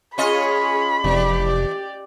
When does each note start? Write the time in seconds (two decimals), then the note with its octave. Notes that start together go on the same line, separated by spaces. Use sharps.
0.18 C#4 F4 G#4 C#5 D#5 B5
1.04 F1 E3 G4 D5